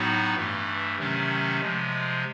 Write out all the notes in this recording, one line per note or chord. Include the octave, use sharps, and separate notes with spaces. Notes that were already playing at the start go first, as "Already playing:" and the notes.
Already playing: A2 F#3 B3 D#4 F#4
G2 E3 A3
C3 D#3 F#3 A3 C#4
C3 F3 G#3